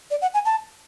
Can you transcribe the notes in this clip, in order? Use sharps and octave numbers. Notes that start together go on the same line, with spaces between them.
D5
F#5
G#5
A5